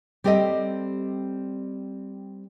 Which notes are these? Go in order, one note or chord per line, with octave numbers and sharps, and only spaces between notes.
G3 C4 G4 A4 D#5